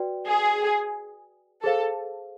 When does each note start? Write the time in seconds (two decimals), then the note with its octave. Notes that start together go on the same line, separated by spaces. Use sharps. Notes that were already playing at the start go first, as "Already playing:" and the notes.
Already playing: F#4 B4 D5 G5
0.27 G#4
1.63 G#4 A4 C5 F5